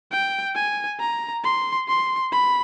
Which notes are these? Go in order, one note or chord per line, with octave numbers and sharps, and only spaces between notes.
G5
G#5
A#5
C6
C6
B5